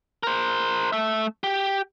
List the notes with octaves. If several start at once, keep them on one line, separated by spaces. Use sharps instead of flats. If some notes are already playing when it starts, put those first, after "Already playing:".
A#4 C5
A3 E5
G4